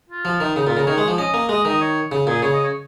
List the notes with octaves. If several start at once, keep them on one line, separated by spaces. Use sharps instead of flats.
F4
F3
D#3
C#3 D#4
A#2 F4
C#3 A#4
D#3 C#5
G#3
F3
C#4 D#5
A#3
G#3 D#5
D#3 D#5
C#5
C#3
A#2 G#4
C#3 C#5
D#5
C#5